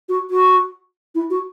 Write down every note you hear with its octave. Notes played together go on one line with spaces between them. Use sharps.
F#4
F#4
E4
F#4